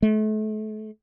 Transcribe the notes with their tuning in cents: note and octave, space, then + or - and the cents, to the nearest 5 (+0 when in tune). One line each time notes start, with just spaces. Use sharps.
A3 -35